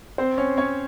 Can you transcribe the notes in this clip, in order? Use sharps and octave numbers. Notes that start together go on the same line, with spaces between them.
C4 C5
C#4 C#5
C#4 C#5